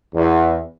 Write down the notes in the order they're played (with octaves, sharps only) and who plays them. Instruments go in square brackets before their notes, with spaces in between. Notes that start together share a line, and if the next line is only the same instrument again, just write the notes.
[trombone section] E2